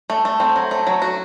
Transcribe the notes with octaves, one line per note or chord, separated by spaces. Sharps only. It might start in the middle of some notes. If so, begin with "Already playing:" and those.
A3
A3
C4
F#3
A3
F#3
F#4